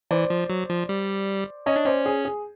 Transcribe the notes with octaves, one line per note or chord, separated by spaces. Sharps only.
E3 C5 D5
F3
F#3
F3
G3
C#4 C#5 D#5
D4
C#4 C5 D5
G#4
G#4